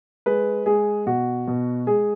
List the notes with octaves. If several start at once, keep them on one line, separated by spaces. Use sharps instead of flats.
G#3 B4
G#3 G#4
B2 F#4
B2
G#3 G#4